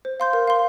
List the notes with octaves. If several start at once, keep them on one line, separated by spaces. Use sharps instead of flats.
C5
F5 C6 G6
A#4
F5 C6